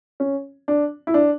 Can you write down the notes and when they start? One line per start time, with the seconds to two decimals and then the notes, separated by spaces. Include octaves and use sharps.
0.20 C#4
0.68 D4
1.07 E4
1.14 D4